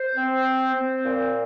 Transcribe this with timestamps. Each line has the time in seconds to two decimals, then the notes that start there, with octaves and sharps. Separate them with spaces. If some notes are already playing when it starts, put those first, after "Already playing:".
Already playing: C5
0.15 C4
0.44 C5
0.74 C4
1.03 A#2